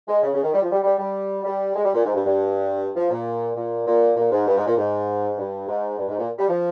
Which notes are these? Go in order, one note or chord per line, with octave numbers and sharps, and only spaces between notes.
G#3
C#3
C#3
D#3
G3
F3
G3
G3
G3
G3
G#3
G3
A#2
G#2
G2
G2
F3
A#2
A#2
A#2
A#2
G#2
G2
G#2
A#2
G#2
G2
G#2
G2
G#2
A#2
G3
F3